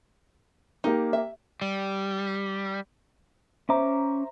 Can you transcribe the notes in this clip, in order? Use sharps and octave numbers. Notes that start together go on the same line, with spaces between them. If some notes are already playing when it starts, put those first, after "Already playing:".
A#3 D#4 G4 A#4
E5
G3
C#4 C5 E5 A#5 D6